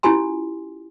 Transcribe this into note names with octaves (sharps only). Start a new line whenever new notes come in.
C#4 E4 F4 G4 G#5 C6